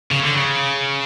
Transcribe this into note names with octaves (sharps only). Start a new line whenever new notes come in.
C#3
D3
C#3